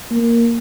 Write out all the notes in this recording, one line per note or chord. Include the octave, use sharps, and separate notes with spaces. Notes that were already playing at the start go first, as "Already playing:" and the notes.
A#3